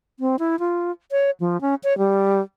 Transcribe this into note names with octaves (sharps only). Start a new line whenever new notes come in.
C4
E4
F4
C#5
F3
C#4
C#5
G3